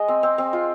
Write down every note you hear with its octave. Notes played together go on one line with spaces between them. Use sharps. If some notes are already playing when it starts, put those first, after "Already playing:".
Already playing: G#3 D#5
C4
C4
C4
F4